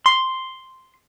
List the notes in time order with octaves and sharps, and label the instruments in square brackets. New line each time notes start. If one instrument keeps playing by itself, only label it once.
[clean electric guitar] C6